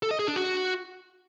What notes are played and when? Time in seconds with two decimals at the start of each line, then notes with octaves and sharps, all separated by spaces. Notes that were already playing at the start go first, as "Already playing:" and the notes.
0.03 A4
0.11 D#5
0.19 G#4
0.28 D4
0.36 F#4